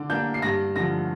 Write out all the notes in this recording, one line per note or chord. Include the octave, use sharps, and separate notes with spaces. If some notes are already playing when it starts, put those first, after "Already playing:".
Already playing: D3 D6
A#3 D4 G6
C7
G2 A#6
D3 F3 A#6